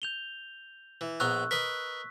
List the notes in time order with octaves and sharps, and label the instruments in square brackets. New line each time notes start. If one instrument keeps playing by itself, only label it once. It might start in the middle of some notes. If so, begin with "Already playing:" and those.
[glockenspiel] G6 F7 G7
[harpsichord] E3
[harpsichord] A#1 B3 A#5 [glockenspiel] C#6 E6 F#6
[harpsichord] A#4 B4 D#5 [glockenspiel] B6